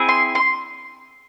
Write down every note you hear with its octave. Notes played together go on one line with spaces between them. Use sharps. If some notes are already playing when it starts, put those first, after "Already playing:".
Already playing: C4 E4 G#4
C6
C6